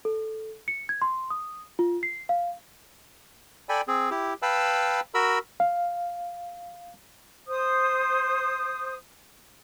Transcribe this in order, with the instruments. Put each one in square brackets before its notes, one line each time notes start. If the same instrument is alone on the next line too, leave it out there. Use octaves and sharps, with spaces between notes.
[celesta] A4
C#7
G#6
C6
D#6
F4
C7
F5
[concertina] A4 D5 G5 G#5 B5
C4 G#4
E4 G4
B4 F5 G5 A5 B5 E6
F#4 A#4 B5 E6
[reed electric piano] F5
[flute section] C5 D#6